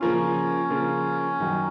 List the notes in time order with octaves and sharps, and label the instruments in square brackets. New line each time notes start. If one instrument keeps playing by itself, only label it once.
[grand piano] C#3 F3 A#3 F4 [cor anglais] C#4
[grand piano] C#3 F3 A#3 F4
F#2 D#3 F#3